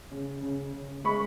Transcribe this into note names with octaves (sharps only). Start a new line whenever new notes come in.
C#3
C#3
C#3
G#3 B5 C#6